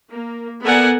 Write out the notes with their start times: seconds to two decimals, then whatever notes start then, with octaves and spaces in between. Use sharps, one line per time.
0.11 A#3
0.63 B3 A4 A#4 D5 F#5 G#5